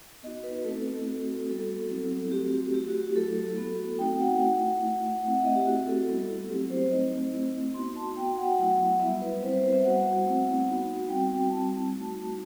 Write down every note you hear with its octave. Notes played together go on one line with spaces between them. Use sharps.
B3 D#4 F#4 D#5
B4
A3 C4 E4 A4
A3 C4 F#4
G3 B3 F#4 A4
F#3 C4 E4
A3 C4 F#4 G4
A3 E4 G4
F#4
G4
F#3 A3 E4 A4
B3 F#4
A3 C4 D#4 F#4 G5
F#5
A3 E4
A3 E4
A3 C4 E4 F#5
E5
D#5
G4
A3 C4 E4 F#4
A4
G3 B3 E4
F#3 A3 C4 E4 G4
C5
A3 C4 D#4 D#5
A3 C4 E4
B3 D#4 F#4 C6
A5
B3 F#4 G5
F#5
F#3 A3 E4 F#5
G3 B3 E4 E5
B4
G3 C4 E4 C5
B4
C5
E5
G3 B3 F#4 F#5
A3 C4 E4
B3 D#4 F#4
G3 C4 F#4 G5
G3 C4 E4 A5
A3 D#4 F#4